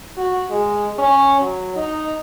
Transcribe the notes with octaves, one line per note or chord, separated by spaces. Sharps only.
F#4
G#3
C#4
F#3
D#4